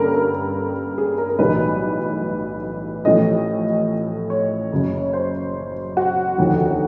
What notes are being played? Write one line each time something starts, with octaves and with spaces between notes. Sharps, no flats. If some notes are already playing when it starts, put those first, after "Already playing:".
Already playing: G2 D3 G3 A#3 C#4 A4 A#4
A#4
G#4
A#4
A#4
B1 A2 E3 G3 B4
A1 A2 F3 A3 D#5
C#5
F#1 F#2 C#3
C5
F#4
F1 D#2 D3 F3